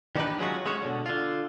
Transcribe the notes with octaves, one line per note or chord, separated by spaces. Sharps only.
D#3 B3 D4 D#4 G4 B4
F#3 G#3 C#4 F4 F#4
G#3 C#4 F#4 C#5
B2 D3
D3 F4